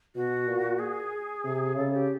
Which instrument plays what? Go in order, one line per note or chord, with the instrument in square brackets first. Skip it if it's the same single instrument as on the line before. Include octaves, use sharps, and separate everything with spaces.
[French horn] B2 [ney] F#4
[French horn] A#2
[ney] G#4
[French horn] C3
[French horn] C#3 [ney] A4
[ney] G4